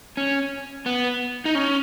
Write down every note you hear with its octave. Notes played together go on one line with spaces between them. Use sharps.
C#4
B3
D#4
C#4